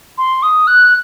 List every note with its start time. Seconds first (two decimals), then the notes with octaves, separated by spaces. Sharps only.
0.18 C6
0.43 D#6
0.67 F#6